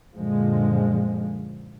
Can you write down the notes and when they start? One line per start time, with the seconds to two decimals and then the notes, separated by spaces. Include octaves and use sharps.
0.15 F#2 A#2 D3 F3 G#3